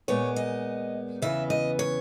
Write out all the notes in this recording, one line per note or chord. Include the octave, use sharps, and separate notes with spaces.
A#2 G#3 B3 C#5
D#5
E2 C#3 E3 B3 E5
D#5
C#5